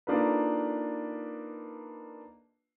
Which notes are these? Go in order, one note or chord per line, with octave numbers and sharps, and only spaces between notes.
A#3 D4 D#4 F4 A4 B4